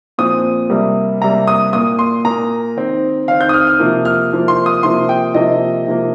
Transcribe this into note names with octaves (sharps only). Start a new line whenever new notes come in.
A#2 F3 C4 D#6
C3 G3 A#3
C3 G3 A#3 A#5
D#6
A#2 A#3 D#6
C6
A#2 A#3 A#5
D#3 C4
D#3 C4 F5
G6
D#6
F6
F6
C3 F3 A#3
F6
C3 F3 A#3
C6
D#6
C3 F3 A#3 C6
G5
C3 F3 A#3 D#5
C3 F3 A#3